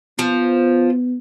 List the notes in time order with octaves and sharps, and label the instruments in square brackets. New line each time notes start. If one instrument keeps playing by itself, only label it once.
[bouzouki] F3 [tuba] B3